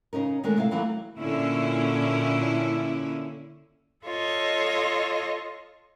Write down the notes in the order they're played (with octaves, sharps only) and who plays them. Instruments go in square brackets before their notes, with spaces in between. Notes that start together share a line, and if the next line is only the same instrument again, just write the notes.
[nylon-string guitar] C#3 C#4 D#4 A#4
D#3 G#3 A3 C#4 D4 A#4
C3 E4 F5
D#3 E3 F#3 A3 E4
[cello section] A#2 D3 C#4 E4
[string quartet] F4 A4 C#5 D#5